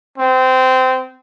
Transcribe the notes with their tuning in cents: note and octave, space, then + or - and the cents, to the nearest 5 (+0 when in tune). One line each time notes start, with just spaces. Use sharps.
C4 -20